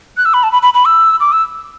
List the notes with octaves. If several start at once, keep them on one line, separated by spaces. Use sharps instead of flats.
F#6
E6
B5
A5
B5
B5
B5
E6
D6
E6